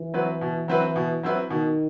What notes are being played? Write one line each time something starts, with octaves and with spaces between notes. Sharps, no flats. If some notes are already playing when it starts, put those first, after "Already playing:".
Already playing: E3
F#3 C4 E4 B4
B2
F#3 C4 E4 B4
B2
F#3 C4 E4 B4
B2 D#3